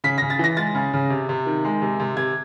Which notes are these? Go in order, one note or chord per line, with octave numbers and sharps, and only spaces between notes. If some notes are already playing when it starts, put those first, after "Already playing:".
C#3 B6
C#3 A#6
A6
E3 A#6
G#3 A6
C#3
C#3
C3
C3
D#3
G#3
C3
C3
C3 G#6